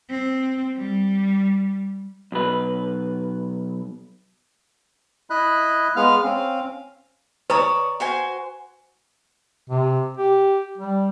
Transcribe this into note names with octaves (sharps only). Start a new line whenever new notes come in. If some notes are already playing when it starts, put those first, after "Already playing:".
C4
G3
B1 B4
E4 D#5 B5 F#6
G#3 B3 F5 F6
C4 C#4 F5
B4 C#5 D5 A#5 D#6
F#4 C5 G#5
C3
G4
G3